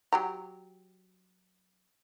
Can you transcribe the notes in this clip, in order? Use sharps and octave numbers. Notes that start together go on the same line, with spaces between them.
F#3 G4 A#5